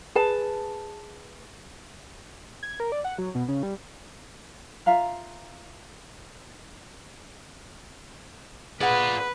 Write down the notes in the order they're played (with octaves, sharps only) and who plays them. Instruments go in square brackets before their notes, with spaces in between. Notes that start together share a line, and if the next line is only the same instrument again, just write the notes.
[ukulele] G#4 B4 A5
[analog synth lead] G#6
A#4
D5
F#5
F#3
B2
C#3
G3
[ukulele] F4 E5 F5 A#5
[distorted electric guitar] F4 D5 [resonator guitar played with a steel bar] G#4 F#5 [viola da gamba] B4